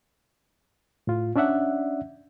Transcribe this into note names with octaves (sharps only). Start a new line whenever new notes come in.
A2 F4
C#4 D4 D5 E5 F#5